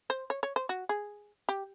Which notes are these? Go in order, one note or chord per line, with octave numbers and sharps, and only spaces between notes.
C5
C#5
C#5
C5
F#4
G#4
G4